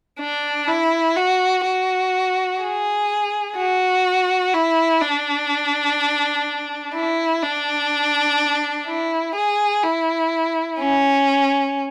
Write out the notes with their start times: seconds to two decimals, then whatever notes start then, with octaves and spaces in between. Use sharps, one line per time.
0.19 D4
0.68 E4
1.16 F#4
1.65 F#4
2.61 G#4
3.56 F#4
4.54 E4
5.01 D4
6.94 E4
7.43 D4
8.87 E4
9.35 G#4
9.83 E4
10.79 C#4